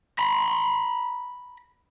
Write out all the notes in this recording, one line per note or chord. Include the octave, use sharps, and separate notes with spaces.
A#5 B5